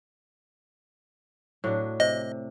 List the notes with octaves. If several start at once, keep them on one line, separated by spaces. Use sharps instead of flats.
A2 F#3 D4
C3 D#5